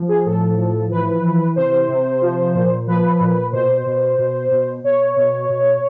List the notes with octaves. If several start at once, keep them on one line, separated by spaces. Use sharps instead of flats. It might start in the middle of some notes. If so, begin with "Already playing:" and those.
Already playing: F3
G#4
A2 A4
F3
E3 B4
E3
C3 C5
C3
F3
A#2
F3 B4
A#2
B2 C5
B2
B2
B2
B2 C#5
B2
B2